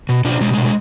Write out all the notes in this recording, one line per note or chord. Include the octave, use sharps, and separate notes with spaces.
B2
B2 D4 F4
B2 G#3
G#3
B2
G#3